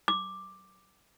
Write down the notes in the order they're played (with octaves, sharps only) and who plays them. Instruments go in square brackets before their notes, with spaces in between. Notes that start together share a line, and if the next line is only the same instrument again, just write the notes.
[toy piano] D6